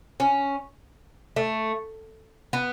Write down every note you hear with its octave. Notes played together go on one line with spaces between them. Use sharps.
C#4
A3
B3